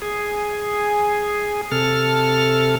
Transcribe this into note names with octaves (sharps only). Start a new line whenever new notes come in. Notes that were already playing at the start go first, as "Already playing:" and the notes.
G#4
C3 A4 F6